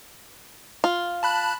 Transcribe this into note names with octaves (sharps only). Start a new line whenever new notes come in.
F4
A5 B5 F#6